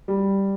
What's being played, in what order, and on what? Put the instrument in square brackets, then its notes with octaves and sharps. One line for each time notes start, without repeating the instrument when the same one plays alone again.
[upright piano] G3